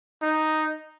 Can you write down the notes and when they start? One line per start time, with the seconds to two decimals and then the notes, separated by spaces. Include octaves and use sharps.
0.22 D#4